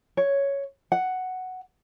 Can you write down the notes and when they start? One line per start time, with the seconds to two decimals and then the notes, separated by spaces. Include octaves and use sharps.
0.17 C#5
0.92 F#5